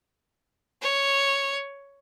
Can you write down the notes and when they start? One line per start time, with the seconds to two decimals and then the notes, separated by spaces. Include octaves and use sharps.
0.82 C#5